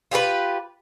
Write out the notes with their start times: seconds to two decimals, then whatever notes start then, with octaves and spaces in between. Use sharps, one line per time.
0.11 F4 G4 G#4 B4